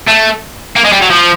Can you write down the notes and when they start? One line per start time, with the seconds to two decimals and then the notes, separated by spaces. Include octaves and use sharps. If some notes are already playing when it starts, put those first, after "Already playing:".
0.07 A3
0.76 A#3
0.85 G#3
0.92 G3
1.02 F#3
1.10 F3